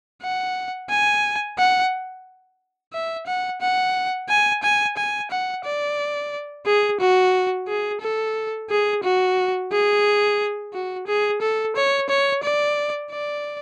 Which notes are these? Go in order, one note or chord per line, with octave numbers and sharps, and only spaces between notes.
F#5
G#5
F#5
E5
F#5
F#5
G#5
G#5
G#5
F#5
D5
G#4
F#4
G#4
A4
G#4
F#4
G#4
F#4
G#4
A4
C#5
C#5
D5
D5